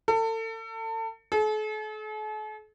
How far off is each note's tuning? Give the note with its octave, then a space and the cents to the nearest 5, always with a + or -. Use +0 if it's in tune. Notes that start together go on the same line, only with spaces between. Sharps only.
A4 +35
A4 -45